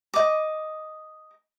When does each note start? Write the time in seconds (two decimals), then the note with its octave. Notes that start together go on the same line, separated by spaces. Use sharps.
0.14 D#5 D6